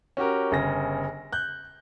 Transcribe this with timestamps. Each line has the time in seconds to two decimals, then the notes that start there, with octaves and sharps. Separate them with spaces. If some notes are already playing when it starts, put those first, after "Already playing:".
0.17 C#4 F#4 G4 A#4
0.51 G1 C#3 A#6
1.33 F#6 G6